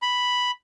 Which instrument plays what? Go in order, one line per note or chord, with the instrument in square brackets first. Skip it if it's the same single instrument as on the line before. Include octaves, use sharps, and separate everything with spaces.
[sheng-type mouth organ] B5